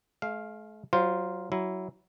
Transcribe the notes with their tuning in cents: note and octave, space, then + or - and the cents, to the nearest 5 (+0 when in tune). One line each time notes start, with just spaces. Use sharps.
A3 -45 F5 +0
F#3 +25 F4 +0 C5 +0
F#3 +15 E4 +0